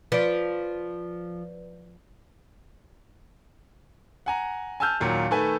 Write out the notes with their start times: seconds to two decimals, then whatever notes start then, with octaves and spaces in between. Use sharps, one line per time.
0.12 F3 B4 D5
4.26 F#5 G#5 A#5
4.80 G#5 A5 E6 F6 G6
5.00 D#2 A#2 F#3
5.31 D#3 A3 A4 B4 G#5